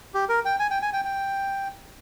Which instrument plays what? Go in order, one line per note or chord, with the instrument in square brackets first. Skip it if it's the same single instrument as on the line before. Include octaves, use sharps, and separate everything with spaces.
[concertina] G4
A#4
G5
G#5
G5
G#5
G5
G5